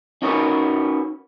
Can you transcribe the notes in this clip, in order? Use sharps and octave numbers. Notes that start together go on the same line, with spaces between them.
C#4 D#4 F#4 A#4 B4